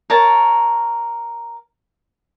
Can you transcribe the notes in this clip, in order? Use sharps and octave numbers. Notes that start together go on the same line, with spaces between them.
A#4 C#5 A5